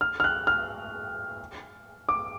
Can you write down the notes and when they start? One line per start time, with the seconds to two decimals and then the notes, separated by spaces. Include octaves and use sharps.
0.01 F6
0.20 F6
0.24 F#6
0.47 F6
2.09 D6